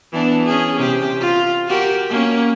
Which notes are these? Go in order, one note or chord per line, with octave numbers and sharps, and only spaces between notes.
E3 B3 D4
C#4 G#4
C3 G4
F4
F#4 G4 A#4
A#3 C#4